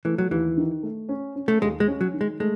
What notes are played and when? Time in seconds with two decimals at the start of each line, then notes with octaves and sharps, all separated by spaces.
0.05 E3 A3
0.18 F#3
0.31 D#2 E3
0.57 D#3
0.83 A3
1.09 C#4
1.35 C#4
1.48 A3
1.62 D#2 G#3
1.80 G#3
1.88 C#4
2.01 F#3
2.14 D#3
2.21 G#3
2.40 G#3 A3